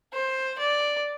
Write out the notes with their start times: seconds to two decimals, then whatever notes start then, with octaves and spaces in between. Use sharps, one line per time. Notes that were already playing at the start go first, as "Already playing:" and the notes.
0.14 C5
0.58 D5